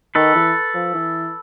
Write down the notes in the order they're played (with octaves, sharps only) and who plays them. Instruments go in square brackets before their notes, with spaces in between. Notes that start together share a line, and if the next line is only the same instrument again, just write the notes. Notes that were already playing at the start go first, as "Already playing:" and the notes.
[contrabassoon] D#3 [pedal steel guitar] A4 B4
[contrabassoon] E3
F3
E3